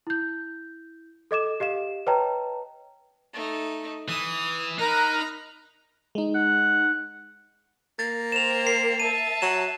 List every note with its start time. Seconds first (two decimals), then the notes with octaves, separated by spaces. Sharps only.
0.07 E4 G6
1.31 A4 D#5 D6 E7
1.60 G4 D#5 F5 E7
2.07 B4 C#5 D#5 G5 A5 A#5
3.34 A3 D#4
4.08 E3 D#6
4.78 D#4 A#4 A#5 B5 F#6
6.15 G#3 D#4
6.35 F#5
7.99 A#3 A6
8.32 A#4 C5 G5 E7 F7
8.67 C7
9.00 E5 A5 D#7
9.42 F#3 E7